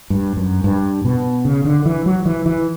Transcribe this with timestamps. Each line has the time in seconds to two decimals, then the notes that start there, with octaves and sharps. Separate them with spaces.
0.10 G2
0.37 F#2
0.64 G2
1.05 B2
1.45 C#3
1.65 D3
1.86 E3
2.06 F#3
2.26 E3
2.46 E3